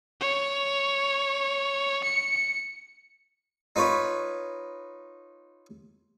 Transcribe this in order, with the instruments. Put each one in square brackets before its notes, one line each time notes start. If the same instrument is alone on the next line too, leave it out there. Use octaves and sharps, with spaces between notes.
[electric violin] C#5
C#7
[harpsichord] D#4 F4 B4 C#5 B5